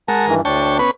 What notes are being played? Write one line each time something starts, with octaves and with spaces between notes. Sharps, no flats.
G#3 A#4 F#5 A5
G2 D#3 E3
D2 D4 C#5 G5 A5
B3 C#4 B4